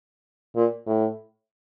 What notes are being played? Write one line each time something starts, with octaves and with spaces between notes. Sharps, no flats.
A#2
A2